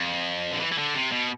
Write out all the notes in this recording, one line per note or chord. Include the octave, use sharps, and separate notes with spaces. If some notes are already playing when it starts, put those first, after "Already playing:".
Already playing: F2
D3
E3
E3
D3
C3
B2